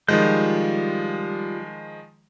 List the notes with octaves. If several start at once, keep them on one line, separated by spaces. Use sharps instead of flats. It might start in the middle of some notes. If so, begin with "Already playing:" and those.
D#3 F3 G3 G#3 F4 G6